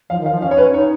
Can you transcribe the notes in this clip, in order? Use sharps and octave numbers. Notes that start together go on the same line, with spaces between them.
F3 F5
D#3
F5
F3
C#4 F5
C#5
C#4 B4
D#4 C#5